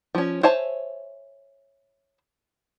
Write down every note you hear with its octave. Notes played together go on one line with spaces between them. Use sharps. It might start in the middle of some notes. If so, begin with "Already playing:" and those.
F3 C#4
C5 C#5 E5 G#5 A5